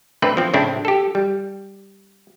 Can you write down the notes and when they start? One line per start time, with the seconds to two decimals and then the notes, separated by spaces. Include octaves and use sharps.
0.22 D3 A3 C4 B4
0.37 F3 C4
0.54 A2 C#3 C4 D4 E4
0.85 G4 A4
1.15 G3